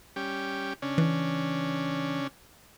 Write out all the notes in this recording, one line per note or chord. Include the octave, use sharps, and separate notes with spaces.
G3 C#4 G4
C#3 C#4 D4
E3